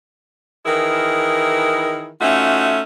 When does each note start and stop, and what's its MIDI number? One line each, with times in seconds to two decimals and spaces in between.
0.66 2.10 51
0.66 2.10 52
0.66 2.10 64
0.66 2.10 68
0.66 2.10 70
2.21 2.82 57
2.21 2.82 61
2.21 2.82 63
2.21 2.82 65
2.21 2.82 66
2.21 2.82 76